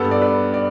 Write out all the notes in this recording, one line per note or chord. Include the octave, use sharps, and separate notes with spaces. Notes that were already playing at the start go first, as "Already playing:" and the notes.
Already playing: G2 G3 B3 A4
D5
B4
D5